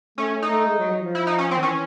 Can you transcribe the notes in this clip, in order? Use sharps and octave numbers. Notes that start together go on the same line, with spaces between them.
A3 C#4
A3
D#4
A3
G#3
F#3
F#3
F3
E4
D#4
C#4
C4
D#3
E3 C#4